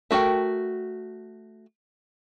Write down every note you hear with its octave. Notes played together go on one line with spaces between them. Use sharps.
A3 F#4 A#4 G5